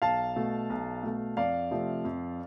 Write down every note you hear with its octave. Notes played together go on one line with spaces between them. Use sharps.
B1 F5 A5
B2 A3
B1
B2 A3
F2 D5 F5
C3 F3 A3 C4
F2